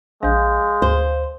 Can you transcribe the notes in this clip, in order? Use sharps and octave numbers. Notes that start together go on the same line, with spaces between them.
A#1 G#3 F5 G6
D2 C5